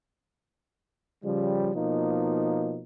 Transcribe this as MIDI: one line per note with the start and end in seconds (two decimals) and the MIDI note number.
1.24 1.71 49
1.24 1.71 53
1.24 1.71 55
1.74 2.82 47
1.74 2.82 53
1.74 2.82 58
1.74 2.82 63